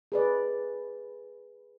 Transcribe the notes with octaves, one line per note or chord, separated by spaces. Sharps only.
G#4 B4 D5